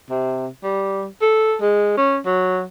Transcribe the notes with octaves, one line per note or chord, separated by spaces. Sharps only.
C3
G3
A4
G#3
C#4
F#3